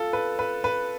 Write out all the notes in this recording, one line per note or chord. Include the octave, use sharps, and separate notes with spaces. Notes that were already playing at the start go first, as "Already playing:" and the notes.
Already playing: F4 A4
B4
B4
B4